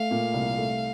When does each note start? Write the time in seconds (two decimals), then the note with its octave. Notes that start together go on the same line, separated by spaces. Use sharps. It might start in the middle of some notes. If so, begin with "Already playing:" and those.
Already playing: A3 F5
0.11 A#2
0.34 C2
0.57 A3